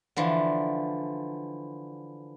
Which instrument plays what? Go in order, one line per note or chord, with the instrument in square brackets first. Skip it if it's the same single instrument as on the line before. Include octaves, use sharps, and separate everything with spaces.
[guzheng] D3 E3 F3